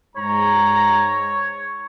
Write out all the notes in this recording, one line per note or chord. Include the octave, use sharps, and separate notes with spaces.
G#2 C#5 A#5